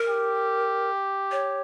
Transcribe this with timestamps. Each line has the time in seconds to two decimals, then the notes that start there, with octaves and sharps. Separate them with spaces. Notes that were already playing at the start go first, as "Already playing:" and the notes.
Already playing: A#4
0.08 G4
1.32 C#5